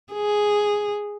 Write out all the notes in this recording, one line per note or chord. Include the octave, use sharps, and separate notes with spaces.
G#4